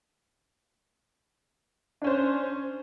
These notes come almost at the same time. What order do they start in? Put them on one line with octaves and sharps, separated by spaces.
D4 C#4 C5